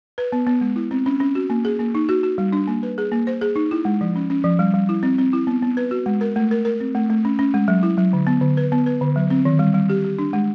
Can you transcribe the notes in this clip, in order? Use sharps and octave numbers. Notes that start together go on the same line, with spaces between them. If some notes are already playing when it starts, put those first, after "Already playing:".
B4
B3
B3
G#3
E4
C4
C#4
C#4
F#4
A#3
G#4
A#3
D#4
F#4
F#4
G3
D4
A#3
B4
G#4
A#3
C5
G#4
D#4
E4
G#3
F3
C#4
C#4
F3
G3
G3
E4
C4
C4
E4
B3
B3
B4
F#4
G#3
A#4
A3
A#4
A#4
C4
A3
A3
C#4
C#4
G#3
F#3
E4
F#3
D3
B3
D3
B4
B3
B4
D3
F#3
C4
D#3
G3
G3
G4
G4
D4
G#3